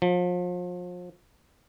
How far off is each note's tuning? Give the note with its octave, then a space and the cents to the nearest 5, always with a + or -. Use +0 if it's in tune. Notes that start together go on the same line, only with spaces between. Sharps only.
F3 +35